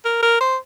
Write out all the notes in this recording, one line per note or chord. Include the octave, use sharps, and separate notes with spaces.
A#4
A#4
C5